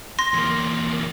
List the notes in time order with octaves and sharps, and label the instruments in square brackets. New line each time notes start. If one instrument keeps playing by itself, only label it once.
[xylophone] C6 A#6
[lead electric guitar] E2 A#3